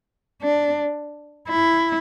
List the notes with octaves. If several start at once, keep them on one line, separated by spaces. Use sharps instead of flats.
D4
E4